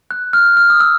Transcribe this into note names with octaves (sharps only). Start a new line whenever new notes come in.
F#6
F6
F6
D#6
E6